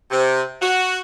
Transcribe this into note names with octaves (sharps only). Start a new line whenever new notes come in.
C3
F#4